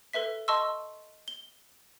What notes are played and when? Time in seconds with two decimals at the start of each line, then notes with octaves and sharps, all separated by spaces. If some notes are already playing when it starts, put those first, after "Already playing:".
0.13 A4 B4 E5 B6
0.48 D#5 A5 C6 C#6 E6
1.28 G7